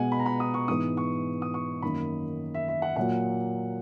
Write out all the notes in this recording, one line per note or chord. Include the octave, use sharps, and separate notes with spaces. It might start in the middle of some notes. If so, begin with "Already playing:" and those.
Already playing: B2 G#3 B3 F#5 G#5
B5
A#5
B5
D#6
C#6
G#2 E3 B3 D#6
C#6
D#6
C#6
F#2 D#3 A#3 B5
E5
E5
F#5
A#2 F#3 A#3 F#5